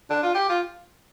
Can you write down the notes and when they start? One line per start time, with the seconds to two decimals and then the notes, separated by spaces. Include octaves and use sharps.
0.10 D4
0.23 F4
0.35 G4
0.49 F4